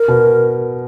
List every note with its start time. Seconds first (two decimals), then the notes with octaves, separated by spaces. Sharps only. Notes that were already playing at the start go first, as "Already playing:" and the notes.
Already playing: A#4
0.08 B2